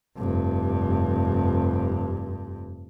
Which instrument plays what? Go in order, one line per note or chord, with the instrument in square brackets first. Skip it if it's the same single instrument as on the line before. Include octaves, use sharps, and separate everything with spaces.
[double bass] F1 G2